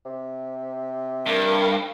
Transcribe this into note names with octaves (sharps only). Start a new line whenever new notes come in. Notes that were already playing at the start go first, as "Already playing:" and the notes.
C3
G2 A#4